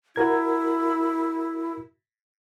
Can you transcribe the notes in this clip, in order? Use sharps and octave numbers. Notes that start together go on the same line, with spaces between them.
E4 F#4 A#4 G#6